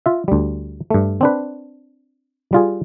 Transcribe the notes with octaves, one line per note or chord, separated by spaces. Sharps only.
F4 E5
D2 G3
G2 A3
C4 D4 B4
G3 F4 G#4